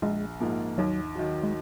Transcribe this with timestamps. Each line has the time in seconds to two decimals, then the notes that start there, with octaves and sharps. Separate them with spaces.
0.02 A#1 G#3
0.40 G#2 F3 A#3
0.78 D#2 F#3
1.15 D#3 F#3
1.43 G#3